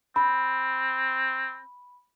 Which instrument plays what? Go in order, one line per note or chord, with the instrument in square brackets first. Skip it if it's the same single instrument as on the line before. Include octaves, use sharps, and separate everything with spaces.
[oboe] C4 [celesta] B5